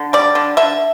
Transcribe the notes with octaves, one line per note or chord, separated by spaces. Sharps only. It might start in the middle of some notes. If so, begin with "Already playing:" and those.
Already playing: D3
G3 D5
D3
D3 E5